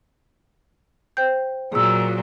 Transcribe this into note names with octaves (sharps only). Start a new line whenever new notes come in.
C5 G5 G6
A#2 F#3 G#4 E6